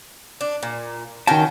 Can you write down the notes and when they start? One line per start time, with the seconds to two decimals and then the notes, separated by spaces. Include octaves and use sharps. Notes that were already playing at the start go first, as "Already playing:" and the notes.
0.41 D4
0.63 A#2
1.27 D#3 C#4 F#4 G5 A5